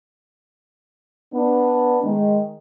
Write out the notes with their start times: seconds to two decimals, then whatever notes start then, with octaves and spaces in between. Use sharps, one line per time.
1.34 B3 D4
2.04 D#3 G#3